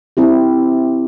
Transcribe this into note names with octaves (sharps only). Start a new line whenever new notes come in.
C4 E4 G4